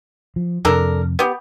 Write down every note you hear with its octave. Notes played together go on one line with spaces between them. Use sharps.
F3
F2 C3 D4 A4 A#4
B3 G4